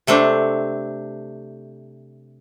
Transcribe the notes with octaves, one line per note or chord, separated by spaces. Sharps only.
C3 A3 C4 D4